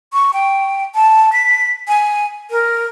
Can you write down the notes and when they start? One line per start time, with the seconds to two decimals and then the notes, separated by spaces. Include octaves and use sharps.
0.13 C#6
0.33 G5
0.95 A5
1.33 B6
1.88 G#5
2.51 A#4